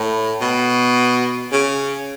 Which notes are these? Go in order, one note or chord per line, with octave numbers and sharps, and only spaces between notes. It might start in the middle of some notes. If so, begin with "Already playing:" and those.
Already playing: A2
B2
C#3